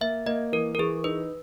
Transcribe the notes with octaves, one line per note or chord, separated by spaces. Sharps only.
A#3 E5
A#3 D#5
E3 A#4
A#4
E3 G#4
D#4 B4